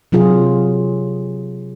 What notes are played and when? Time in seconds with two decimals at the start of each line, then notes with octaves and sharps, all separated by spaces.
0.12 C3 F#3 F4 G#4